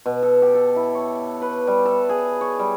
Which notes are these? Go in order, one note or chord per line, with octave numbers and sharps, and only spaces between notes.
B2
A4
G4
A4
E4
C#5
B4
G3
A4
G#4
C#5
G3